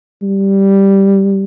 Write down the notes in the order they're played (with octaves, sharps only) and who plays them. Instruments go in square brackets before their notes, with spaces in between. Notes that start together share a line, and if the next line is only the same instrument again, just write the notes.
[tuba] G3